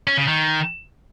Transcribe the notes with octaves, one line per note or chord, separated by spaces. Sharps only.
C#4
C#3
D#3